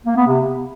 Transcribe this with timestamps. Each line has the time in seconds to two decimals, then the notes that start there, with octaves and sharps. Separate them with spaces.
0.06 A#3
0.16 B3
0.26 C3